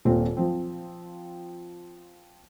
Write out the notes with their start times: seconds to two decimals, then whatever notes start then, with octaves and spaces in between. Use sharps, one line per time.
0.05 D#1 A#2 C4 F4
0.37 F3 C4